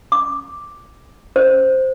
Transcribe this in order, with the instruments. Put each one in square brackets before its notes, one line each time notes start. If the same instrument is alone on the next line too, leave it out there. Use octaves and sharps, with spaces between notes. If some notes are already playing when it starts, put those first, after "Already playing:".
[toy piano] D6
C5